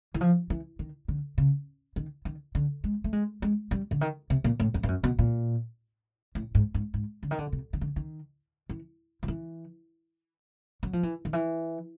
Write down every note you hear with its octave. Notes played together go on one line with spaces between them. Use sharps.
E3
F3
E3
D#3
D3
C#3
D#3
D#3
D3
G#3
A3
G#3
G#3
G3
D3
D#3
C3
A#2
A2
F2
G2
F#2
B2
A#2
A2
G#2
G#2
G#2
D3
D#3
D3
C3
D#3
D3
D#3
E3
F3
E3
F#3
F3
E3
D#3
E3